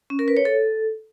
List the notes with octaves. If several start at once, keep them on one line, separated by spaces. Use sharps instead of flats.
C#4
A#4
B4
C#5
A4